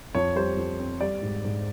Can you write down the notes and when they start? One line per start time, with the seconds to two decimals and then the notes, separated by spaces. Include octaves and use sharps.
0.15 F2 C#5
0.35 G3 C5
0.57 F2
0.79 C4
1.00 G3 D5
1.22 G#2
1.44 G#2